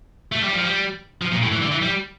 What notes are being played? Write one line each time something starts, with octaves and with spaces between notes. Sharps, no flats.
A3
G3
F3
G3
F3
A#2
A2
E3
D3
E3
G3